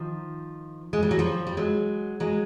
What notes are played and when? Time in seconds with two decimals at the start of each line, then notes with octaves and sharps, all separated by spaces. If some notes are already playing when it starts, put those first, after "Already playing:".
Already playing: D#3 F3
0.93 G#3
1.02 G3
1.11 F#3
1.19 F3 G3
1.47 G3
1.57 F#3 G#3
2.20 F#3 G#3